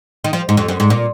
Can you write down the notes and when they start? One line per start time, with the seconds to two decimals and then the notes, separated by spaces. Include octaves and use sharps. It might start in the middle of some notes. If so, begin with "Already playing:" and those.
0.24 D#3
0.33 F3
0.49 G#2
0.57 F2
0.68 F#2
0.80 G#2
0.90 A#2